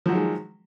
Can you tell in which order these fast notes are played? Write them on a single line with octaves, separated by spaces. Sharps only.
F3 F#3 D#3 G#3